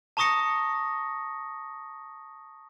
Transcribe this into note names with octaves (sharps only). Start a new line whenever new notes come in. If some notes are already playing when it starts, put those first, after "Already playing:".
A5 A#5 C#6 D#6 A#6 C#7